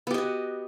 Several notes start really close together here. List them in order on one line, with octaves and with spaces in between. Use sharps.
B3 G4 D#5 F#4